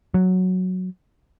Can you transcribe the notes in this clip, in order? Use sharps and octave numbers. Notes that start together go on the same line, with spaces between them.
F#3